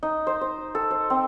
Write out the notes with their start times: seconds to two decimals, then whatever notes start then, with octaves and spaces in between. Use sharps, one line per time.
0.03 D#4
0.27 C5
0.41 C5
0.75 A4
0.91 C5
1.10 C4